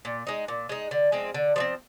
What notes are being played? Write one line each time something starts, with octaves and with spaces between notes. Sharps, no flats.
A#2
G#3 D#4
A#2
G#3 D#4
D3
F3 G#3 C4
D3
F3 G#3 C4